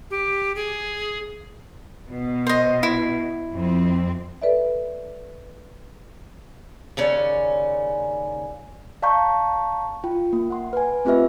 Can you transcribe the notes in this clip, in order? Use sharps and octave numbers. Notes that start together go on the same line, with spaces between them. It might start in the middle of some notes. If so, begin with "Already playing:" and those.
G4
G#4
B2
C5 D#5
E4
F2 C4
A4 B4 D5 E5
D#2 C#3 C#4 D5
D5 F5 A5 A#5 C#6 G6
F4 G5
A#3
F#5 C6
B4 G#5
A3 C4 F4 G4 B4 E5